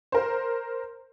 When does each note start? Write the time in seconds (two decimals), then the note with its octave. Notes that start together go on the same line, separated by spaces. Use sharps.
0.12 A#4 C5